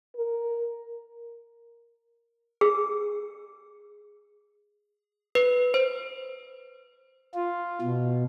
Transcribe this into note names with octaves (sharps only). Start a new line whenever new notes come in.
A#4
G#4
B4
C5
F4
B2